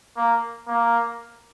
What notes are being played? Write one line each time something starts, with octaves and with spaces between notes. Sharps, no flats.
A#3
A#3